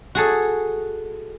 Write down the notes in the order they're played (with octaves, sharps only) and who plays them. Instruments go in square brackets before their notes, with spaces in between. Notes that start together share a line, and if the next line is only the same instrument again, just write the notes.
[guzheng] F#4 G#4 A4